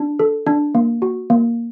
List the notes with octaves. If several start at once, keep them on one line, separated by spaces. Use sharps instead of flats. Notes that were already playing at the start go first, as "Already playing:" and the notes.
Already playing: D4
A4
D4
A#3
F#4
A#3